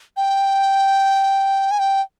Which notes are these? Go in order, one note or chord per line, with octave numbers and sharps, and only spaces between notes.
G5
G#5
G5